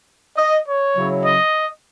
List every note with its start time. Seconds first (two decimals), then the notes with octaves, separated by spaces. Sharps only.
0.37 D#5
0.67 C#5
0.96 C#3 F#3 C#4 E4
1.25 D#5